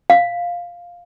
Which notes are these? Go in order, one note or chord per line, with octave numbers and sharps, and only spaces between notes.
F5